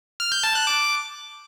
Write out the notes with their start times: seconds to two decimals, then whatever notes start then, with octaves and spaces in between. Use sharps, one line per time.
0.20 F6
0.32 G6
0.43 A5
0.55 F#6
0.67 D6